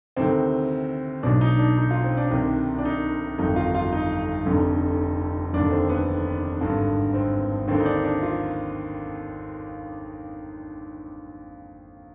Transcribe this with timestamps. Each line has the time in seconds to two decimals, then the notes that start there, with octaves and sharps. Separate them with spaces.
0.17 D2 C3 D#3 C4
1.23 B1 B2 D4
1.41 D#4
1.59 D4
1.78 D#4
1.91 F4
2.04 C4
2.17 D4
2.31 C2 C3 D#3
2.78 D4
2.85 D#4
3.38 G1 F2 D#3 D#4
3.56 F4
3.75 F4
3.92 D#4
4.45 F1 F2 D3
5.53 F1 D#2 D3 D4
5.71 C4
5.89 B3
6.61 G#1 G2 D3
7.14 C4
7.68 D#2 D3 C4
7.80 D#4
7.86 D4
8.04 D4
8.23 F4